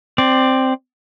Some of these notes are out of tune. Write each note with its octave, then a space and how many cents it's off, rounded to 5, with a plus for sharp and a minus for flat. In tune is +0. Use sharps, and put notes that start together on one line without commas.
C4 +0 D5 +15